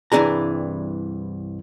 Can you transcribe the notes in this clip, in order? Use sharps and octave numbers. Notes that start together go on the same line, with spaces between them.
C2 G2 E3 D4 G#4 A#5